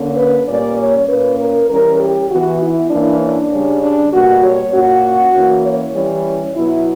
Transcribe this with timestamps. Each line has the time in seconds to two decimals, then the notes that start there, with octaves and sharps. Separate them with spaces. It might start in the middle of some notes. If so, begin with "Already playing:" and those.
Already playing: D3 A#3 C#4
0.17 B4
0.47 A#2 G3 A#3 C#4 D5
0.78 C#5
1.08 A#2 A#3 C#4 B4
1.39 A#4
1.69 E3 G3 C#4 A#4
1.99 G4
2.29 E3 B3 F#4
2.60 E4
2.90 E3 A#3 C#4 D4
3.22 D4
3.51 C#3 G3 C#4
3.81 D4
4.12 B2 G3 A#3 F#4
4.42 C#5
4.73 A#2 A#3 C#4 F#4
5.34 E3 A#3 C#4
5.64 C#5
5.95 E3 G3 C#4
6.55 B2 F#3 B3 E4